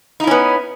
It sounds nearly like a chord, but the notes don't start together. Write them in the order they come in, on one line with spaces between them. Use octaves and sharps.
D#4 E4 C#4 B3